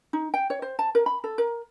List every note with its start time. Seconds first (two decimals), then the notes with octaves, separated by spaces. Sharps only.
0.13 D#4
0.34 G5
0.50 C#5
0.62 C5
0.79 A5
0.95 A#4
1.06 B5
1.24 A4
1.38 A#4